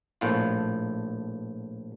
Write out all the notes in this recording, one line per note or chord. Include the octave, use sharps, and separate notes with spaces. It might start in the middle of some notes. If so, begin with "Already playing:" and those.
A#1 A2 F4